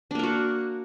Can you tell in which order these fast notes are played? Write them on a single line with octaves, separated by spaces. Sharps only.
D4 A#3 A#4 F#4